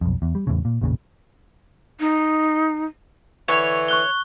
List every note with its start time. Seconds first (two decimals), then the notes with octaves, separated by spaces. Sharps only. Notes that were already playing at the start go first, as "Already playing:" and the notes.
0.01 B1 F2
0.22 E2
0.35 G3
0.47 E2 A2 C#3
0.65 A#2
0.81 A1 E2 A#2 C#3
2.00 D#4
3.48 D3 E3 C#5
3.88 C#6 F#6 G7